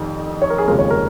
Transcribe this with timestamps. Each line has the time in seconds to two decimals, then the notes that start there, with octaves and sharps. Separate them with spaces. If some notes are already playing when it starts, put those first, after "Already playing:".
Already playing: F1 F2 D#3
0.42 C#5
0.50 A#4
0.58 G#4
0.67 F1 D#2 C#3 F3 G#3 A#4
0.79 C#5
0.91 A#4